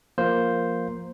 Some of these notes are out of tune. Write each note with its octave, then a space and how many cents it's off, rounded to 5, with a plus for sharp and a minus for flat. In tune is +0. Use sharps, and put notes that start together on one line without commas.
F3 +0 A#3 +0 C5 +0